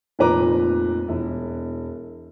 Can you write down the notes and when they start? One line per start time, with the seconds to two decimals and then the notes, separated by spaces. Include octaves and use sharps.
0.19 F1 F2 A#2 B4 A#5 D6
1.08 E1 E4